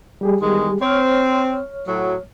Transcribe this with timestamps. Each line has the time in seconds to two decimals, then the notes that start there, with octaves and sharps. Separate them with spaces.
0.21 G3 G4 G#4
0.41 E2 D#3 G#3
0.81 C4 C#5 F6
1.88 A2 F#3